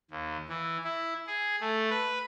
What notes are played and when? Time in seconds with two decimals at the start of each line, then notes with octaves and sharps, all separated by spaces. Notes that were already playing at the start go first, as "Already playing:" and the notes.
0.11 D#2
0.49 E3
0.84 E4
1.27 G#4
1.61 A3
1.90 B4